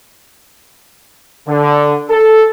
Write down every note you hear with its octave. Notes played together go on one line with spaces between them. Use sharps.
D3
A4